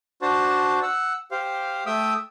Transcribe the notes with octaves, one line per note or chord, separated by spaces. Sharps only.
D4 F#4 C5 A5
F#5 E6
G4 C5 F5
A3 E5 G5 D#6 E6